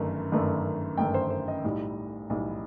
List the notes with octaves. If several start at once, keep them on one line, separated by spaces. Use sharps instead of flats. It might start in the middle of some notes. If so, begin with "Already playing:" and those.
Already playing: G1 F#2 D#3 A3
G1 F#2 D#3 A3
G1 F#2 D#3 A3 G5
C5
C5
D#5
B1 A2 G3 D#4
B1 A2 G3 D#4